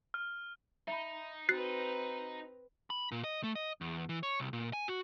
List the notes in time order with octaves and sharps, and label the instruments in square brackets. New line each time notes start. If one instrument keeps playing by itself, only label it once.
[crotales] F6
[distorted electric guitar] D#4 [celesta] E5 B5
[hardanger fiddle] C4 B4 [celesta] F#4 [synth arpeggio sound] F#6 A6 C7
[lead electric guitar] B5
A#2
D#5
A3
D#5
E2
E3
C#5
C2
A#2
G#5
F#4